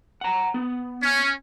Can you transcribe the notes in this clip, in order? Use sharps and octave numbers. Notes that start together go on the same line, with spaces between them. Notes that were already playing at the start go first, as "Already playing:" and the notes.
F#5 A#5
B3
C#4